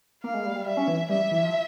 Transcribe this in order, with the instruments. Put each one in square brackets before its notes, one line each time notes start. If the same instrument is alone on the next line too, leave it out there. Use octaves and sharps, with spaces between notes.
[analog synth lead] A#3 [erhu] F5
[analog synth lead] G#3
G3
G3
[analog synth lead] G3 [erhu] E5
[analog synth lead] C#4
E3
[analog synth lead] G3 [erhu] E5
[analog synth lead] E3
F3